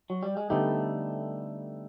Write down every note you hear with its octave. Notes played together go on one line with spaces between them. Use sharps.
F#3
G3
G#3
D3 G3 A3 B3 D#4 G4